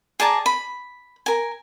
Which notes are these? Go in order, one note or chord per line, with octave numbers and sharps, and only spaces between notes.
G#4 D5 A5 A#5
B5
A#4 G#5